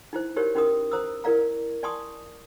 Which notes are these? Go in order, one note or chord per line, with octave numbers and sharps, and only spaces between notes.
D#4 E4 C5
D#4 F#4 G4 A#4 C5 C#5
C#4 D#4 F#4 A#4 D#6
C5 A#5 D#6 E6
E4 A#4 D5 F5 A#5
D5 G#5 A5 C6 C#6 D#6